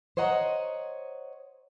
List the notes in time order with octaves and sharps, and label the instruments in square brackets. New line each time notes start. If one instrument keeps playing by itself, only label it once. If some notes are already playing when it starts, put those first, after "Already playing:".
[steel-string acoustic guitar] C5 C#5 D#5 F#5 A#5